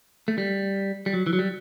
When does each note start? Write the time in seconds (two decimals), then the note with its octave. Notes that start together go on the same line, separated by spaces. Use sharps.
0.28 A3
0.38 G3
1.06 G3
1.13 F#3
1.27 E3
1.33 F#3
1.39 G3